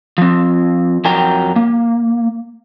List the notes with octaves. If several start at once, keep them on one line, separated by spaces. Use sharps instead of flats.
F3 C4
F2 F#3 A#4 G5 A#5
A#3